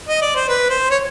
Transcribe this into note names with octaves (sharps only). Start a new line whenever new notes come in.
D#5
D5
C5
B4
C5
C#5